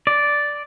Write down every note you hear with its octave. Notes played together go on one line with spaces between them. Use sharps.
D5